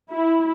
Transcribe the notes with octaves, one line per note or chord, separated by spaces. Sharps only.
E4